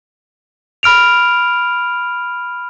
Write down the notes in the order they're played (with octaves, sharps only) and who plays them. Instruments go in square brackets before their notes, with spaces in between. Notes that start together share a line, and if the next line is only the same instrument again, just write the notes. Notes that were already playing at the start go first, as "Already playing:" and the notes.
[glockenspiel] B5 F6 D7 F7